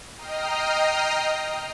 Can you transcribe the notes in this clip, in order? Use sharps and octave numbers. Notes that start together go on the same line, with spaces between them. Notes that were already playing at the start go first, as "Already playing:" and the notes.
D#5 G5 A#5 D#6 F6 C7